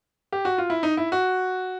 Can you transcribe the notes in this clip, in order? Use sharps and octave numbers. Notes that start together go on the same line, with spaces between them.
G4
F#4
F4
E4
D#4
E4
F#4